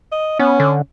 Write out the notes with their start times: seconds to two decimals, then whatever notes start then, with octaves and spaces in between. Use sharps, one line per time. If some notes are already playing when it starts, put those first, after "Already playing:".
0.12 D#5
0.39 B3 C#4
0.60 D3